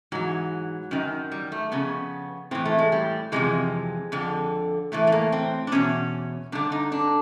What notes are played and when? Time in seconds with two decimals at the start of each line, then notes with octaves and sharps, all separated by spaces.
0.12 G#2 E3 F#3
0.91 F#2 D#3
1.32 G3
1.52 A3
1.72 F2 C#3 B3
2.51 A2 E3 C4
2.65 A3
2.79 G#3
2.92 G3
3.32 F2 C3 E3 G#3
4.12 F2 D3
4.92 A2 E3 A3
5.07 A3
5.12 A#3
5.32 C4
5.67 D4
5.72 E2 B2 C#4
6.52 G2 D3 D4
6.72 D#4
6.92 D4